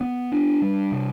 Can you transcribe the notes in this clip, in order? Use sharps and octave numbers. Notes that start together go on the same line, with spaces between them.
B3
D4
G3
C3